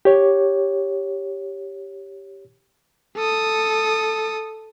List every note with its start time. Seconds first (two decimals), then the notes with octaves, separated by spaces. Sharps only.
0.05 G4 C#5
3.17 A4 D#6